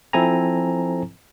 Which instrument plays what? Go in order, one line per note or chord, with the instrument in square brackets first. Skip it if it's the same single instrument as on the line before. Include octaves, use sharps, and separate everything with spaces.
[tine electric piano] F3 C4 E4 A4 G#5 A#5